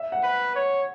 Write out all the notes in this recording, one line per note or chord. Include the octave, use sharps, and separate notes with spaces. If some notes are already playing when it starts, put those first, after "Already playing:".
Already playing: E5
F#5
B4
C#5